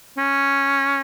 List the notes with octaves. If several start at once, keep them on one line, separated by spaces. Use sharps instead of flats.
C#4